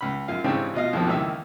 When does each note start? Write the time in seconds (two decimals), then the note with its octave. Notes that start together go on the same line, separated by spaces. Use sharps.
0.01 C#2 B5
0.28 F#2 F4 F5
0.44 G#2 C#3 E3 C4 D4 G4
0.74 B2 F4 D#5 F5
0.93 F2 B2 D#3 F3 G3 C4
1.06 C#2 D#3 E3 A#3 E5 E6